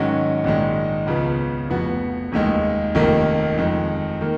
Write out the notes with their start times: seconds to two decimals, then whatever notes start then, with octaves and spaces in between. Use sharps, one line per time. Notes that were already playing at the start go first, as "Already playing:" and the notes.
Already playing: G#2 D#3 F#3 C#4 F#4
0.44 A#1 G#2 D#3 G#3
1.07 C#2 C#3 F3 B3
1.69 F1 F2 F3 B3 F#4
2.32 F1 D#2 D#3 G#3
2.95 F1 F2 D#3 A#3
3.57 F2 D#3 G#3
4.21 D#3 A#3